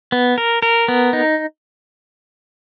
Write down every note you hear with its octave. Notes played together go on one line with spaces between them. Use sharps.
B3
A#4
A#4
B3
D#4